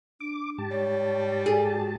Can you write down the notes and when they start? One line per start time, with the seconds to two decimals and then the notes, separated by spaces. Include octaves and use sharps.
0.20 D4 D6
0.58 G#2 G4 A5
0.71 G3 C#5
1.46 G#4 A4
1.72 F#4